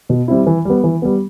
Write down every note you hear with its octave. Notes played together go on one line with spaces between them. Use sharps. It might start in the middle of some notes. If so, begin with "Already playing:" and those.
B2
G3 C4 E4
E3
G3 B3
E3
G3 B3